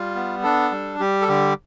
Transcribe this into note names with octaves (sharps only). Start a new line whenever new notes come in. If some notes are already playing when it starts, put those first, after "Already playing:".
Already playing: G3 F4
B3
D4 A4
G3
G3 G4
A4
D3 G4